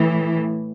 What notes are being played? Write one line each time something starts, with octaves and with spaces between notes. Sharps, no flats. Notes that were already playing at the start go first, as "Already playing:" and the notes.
Already playing: A2 E3